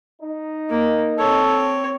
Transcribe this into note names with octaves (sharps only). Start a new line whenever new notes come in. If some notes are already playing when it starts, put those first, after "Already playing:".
D#4
A#3
C4 A4 C#5